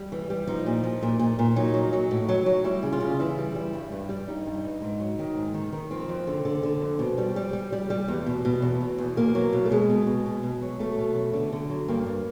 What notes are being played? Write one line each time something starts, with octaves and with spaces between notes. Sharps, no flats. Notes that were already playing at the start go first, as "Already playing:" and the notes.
Already playing: G3
E3
G3
F3 D#4
A#2
F3
A#2
A#2
A#2
F#3 D#4
F#3
F#3
A2
F#3
F#3
G3 E4
C#3
F4
C#3
E3 E4
G3
G3
G2
G2
G3
G2 D#4
G2
G2
G#2
F#3
D#3
G#2
D#3
D#3
F3 C4
F2
D3
D3
D3
F2
B2
G3
G3
G3
G3
G3
E2
B2
B2
E2
B2
E2
B2 A#3
F#3
B2
A3
B2 G#3
B2
B2
B2
B2
F#3
B2 A3
B2
F#3
D3
D3
F#3
G2 A#3
G2